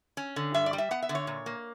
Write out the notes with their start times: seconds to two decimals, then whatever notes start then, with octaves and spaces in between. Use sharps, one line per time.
0.17 C#4
0.36 D3
0.54 G2 E5
0.66 D5
0.73 G3
0.78 E5
0.91 B3 F#5
1.02 E5
1.09 D3
1.15 C#5
1.27 A#2
1.46 A#3